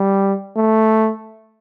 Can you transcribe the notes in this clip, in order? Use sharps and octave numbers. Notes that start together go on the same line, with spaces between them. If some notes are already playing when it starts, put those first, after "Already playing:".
Already playing: G3
A3